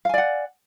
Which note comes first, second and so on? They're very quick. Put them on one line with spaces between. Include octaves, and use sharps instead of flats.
F5 G#5 D5 F#5